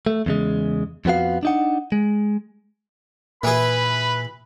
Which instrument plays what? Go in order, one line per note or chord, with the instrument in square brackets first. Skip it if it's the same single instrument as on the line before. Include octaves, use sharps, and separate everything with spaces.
[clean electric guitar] A3
E2 C#3 G#3
F2 F3 B3 F#4 F5
D4 D#4 F#5
G#3
[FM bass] A#2 [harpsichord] E3 G#4 [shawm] B4 [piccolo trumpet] B5